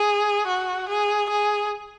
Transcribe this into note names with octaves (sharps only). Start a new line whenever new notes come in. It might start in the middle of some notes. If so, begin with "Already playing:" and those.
Already playing: G#4
F#4
G#4
G#4